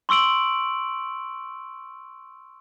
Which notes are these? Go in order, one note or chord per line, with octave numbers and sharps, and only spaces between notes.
C6 C#6 E6 D7 F#7